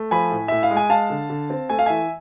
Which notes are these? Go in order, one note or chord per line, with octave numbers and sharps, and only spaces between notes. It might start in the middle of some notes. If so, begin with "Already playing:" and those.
Already playing: A3
F3 G#5 B5
A2
A2 E5
F5
G#3
G#5
G#3 F5 A5
D3
D3
C4
A3 G#5
F5
E3 E5 G#5